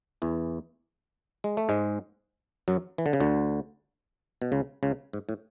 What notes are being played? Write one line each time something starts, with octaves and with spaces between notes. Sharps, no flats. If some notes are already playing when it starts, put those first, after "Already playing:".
E2 E3
G#3
A3
G#2 G#3
F#2 F#3
E3
D3
C#3
D2 D3
B2
C#2 C#3
C#2 C#3
G#2
A2